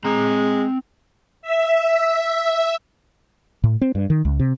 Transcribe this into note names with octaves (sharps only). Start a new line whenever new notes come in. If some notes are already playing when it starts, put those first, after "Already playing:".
G#3 C4 A#5
E5
A2
C4
G2
D#3
C#2
C3